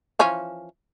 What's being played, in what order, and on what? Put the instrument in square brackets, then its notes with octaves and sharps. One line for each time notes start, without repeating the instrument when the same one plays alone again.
[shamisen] E3 F3 C#4